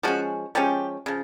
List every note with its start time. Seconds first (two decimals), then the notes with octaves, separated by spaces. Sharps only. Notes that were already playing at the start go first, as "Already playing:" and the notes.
0.03 F3 G#3 C#4 F#4
0.55 F3 G#3 C#4 G4
1.06 C#3 F3